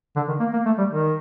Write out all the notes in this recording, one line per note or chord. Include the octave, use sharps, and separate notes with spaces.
D3
D#3
A#3
A#3
A3
G3
D#3